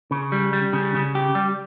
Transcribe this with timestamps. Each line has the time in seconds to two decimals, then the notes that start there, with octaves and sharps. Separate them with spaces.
0.11 C#3
0.32 G3
0.53 G3
0.73 C#3
0.95 C#3
1.15 G4
1.35 G3